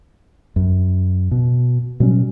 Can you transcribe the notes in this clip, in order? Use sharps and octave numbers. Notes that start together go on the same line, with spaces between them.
F#2
B2
B2 F#3 G3 C#4